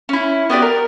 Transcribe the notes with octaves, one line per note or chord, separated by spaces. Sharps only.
C#4 E4
B3 F#4 G4 D5
A#4